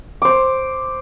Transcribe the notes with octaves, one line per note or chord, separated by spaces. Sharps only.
C5 D6